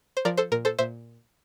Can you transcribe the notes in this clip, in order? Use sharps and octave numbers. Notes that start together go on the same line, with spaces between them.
C5
F3 A#4 D5
A4 C5
A#2 A#4
A4 C5
A#2 C5 E5